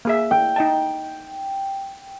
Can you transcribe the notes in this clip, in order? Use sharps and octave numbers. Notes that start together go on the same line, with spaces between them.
A#3 G#4 E5
G5
D#4 D#5 A5